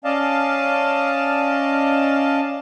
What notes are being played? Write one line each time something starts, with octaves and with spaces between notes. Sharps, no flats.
C#4 D5 D#5 F5 A5